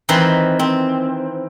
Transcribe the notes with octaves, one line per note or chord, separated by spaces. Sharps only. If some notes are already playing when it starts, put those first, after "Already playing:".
D#3 E3 C4 B4 A#5 C6
C4